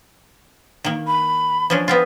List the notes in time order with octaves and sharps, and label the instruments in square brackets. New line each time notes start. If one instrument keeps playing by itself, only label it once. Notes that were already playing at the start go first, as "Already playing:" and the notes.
[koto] D#3 A#3
[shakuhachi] B5
[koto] F3 C#4 D4
B3 C4 F4